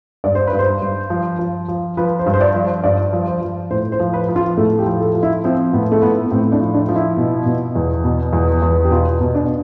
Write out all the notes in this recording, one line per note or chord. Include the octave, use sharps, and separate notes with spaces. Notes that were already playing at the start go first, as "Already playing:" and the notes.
G2 D5
C5
B4
G2
C5
G2
F3
F3
F3
F3 B4
C5
G2
C5
D5
F3
C5
G2 D5
F3
C5
F3
A2 C5
C5
F3
B4
F3
F4
A2 A3
G4
F3
A4
F3
E4
F3 C4
A2 B3
A3
A2 B3
A2 C4
D4
F3
D4
F3
E4
B2
B2
E2
B2
E2
E2
G4
B2 F4
B2
D4